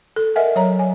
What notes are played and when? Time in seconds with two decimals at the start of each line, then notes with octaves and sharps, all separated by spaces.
0.16 A4
0.36 A#4 D#5 E5 F#5 G#5
0.56 F#3 C#5 A#5
0.79 G#5